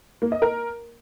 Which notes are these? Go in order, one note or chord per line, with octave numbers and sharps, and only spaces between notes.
A#3
D#5
A#4